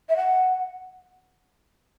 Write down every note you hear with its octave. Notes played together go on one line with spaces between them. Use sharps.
E5
F#5